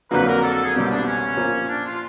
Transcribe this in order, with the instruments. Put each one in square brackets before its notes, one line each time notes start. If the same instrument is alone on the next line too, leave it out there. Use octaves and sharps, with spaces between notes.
[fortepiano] F2 D3 F#3 A#3 [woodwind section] B4
[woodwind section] A#4
A4
A4
G#4
[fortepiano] C2 B2 G3 A#3 [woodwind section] G4
[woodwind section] D4
C#4
[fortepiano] A#2 F3 A#3
[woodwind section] D4
F4